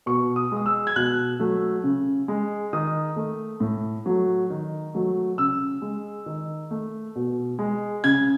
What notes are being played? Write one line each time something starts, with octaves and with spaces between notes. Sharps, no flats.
B2 C#6
D#6
G#3 D#6
E6
G#6
B2 F#6
F#3 A3
C#3
G#3
D#3 D#6
A3
A2
F#3 A3
D#3
F#3 A3
C#3 E6
G#3
D#3
A3
B2
G#3
C#3 G#6